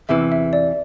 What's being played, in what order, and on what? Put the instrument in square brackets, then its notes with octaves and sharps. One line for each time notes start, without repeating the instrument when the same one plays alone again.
[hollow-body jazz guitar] E2 C3 E3 [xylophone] E5
[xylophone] E5
D5